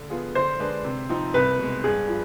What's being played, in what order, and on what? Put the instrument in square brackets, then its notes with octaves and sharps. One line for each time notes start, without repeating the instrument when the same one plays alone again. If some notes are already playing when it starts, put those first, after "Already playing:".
Already playing: [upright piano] D3
F3 B3 F4 G#4
[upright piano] D3 [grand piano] C5
[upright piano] G#3 D4 G#4 B4
C3
F3 C4 D#4
[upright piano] C2 [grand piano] B4
[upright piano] B2 G#3
[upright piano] G2 [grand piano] G#4
[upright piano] F3